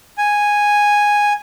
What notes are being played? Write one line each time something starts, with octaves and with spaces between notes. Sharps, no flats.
G#5